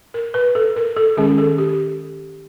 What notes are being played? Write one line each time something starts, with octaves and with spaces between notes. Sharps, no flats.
A#4
B4
A4
A#4
A4
D#3 G#3 C#4 G#4
A4
G4